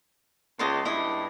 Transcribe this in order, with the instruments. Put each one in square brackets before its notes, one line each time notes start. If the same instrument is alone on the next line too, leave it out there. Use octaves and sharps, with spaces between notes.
[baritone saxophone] C#2 [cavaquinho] D#5 A5 C6
[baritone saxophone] G2 [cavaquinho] E4 D#5